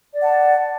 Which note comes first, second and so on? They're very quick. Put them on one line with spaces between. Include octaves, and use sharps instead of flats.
D5 F#5 A5